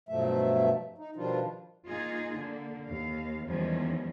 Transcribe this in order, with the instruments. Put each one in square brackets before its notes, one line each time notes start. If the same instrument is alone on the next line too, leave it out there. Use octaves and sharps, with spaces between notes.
[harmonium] G2 B2 F3 F#3 A3 E5
D#4
B2 D#3 F3 G3 D4 F4
[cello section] A#3 D#4 F4 G#4
D3 A#3
D#2 F5
E2 D#3 F3 G3 G#3 C#4